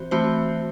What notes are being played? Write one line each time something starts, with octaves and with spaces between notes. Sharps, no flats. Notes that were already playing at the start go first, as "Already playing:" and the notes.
Already playing: E3 C4 F#4 C5
E3 A3 C4 F#4 C5